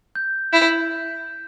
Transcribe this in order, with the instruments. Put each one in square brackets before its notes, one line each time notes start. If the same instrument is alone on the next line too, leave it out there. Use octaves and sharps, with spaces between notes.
[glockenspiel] G6
[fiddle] E4 [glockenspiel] G6